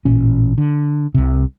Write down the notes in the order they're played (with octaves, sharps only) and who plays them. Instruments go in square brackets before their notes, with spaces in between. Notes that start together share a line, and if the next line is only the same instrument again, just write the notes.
[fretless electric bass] A1 A#2 C#4
D3
C2 C3